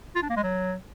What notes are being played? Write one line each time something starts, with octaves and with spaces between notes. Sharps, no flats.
F4
D4
A#3
G#3
F#3